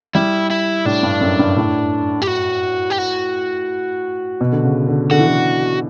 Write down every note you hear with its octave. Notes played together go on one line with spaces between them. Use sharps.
G3 E4
E4
A2 D4
G2
F#2
G2
A2
G4
F#4
G4
F#4
B2
D3
C#3
D3
D3 F#4
E3
D3